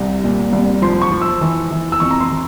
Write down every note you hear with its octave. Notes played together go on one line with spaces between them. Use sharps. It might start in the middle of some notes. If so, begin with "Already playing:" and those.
Already playing: C2 C3
A#2
C2
F3 C6
C#6
F3
E6
E3
E3
E6
F2 C#6
A#5
C6
E3